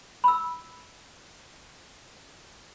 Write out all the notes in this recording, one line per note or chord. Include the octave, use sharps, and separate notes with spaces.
B5 E6